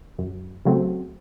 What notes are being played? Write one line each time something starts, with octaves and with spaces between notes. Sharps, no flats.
F#2
C#3 F#3 A3 C4